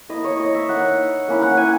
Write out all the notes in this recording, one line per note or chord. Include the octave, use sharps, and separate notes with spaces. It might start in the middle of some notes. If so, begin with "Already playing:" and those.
A#3 E4 D#5
C#5
D#5
E5
A#3 D#4 F#5
A#3 C#4 E4
F#5
G#5